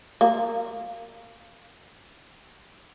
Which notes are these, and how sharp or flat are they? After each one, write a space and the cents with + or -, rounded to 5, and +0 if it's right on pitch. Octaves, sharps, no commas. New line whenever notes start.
A#3 -20